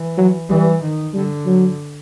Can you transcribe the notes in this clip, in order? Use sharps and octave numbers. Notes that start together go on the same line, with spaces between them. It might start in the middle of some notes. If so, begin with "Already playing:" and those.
Already playing: E3
F#3
E3 G3
D#3
D3 G3
F#3